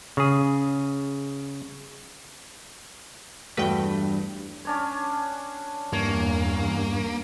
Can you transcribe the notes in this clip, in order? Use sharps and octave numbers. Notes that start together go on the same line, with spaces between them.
C#3 G#4
E2 G2 A3 F#4 B4 G5
C#4 D4 C#5
E2 G2 A#3 C#5